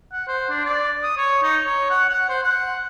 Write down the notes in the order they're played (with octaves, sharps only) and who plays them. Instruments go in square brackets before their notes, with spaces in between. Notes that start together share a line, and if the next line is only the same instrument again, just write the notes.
[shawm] F#5
C5
D4
D5
D#6
C#5
D#4
C#5
F#5
F#5
C5
F#5